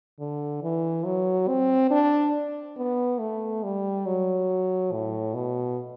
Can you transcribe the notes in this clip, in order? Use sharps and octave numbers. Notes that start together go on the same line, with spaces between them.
D3
E3
F#3
C4
D4
B3
A3
G3
F#3
A2
B2